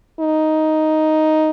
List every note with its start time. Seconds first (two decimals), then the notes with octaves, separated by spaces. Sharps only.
0.20 D#4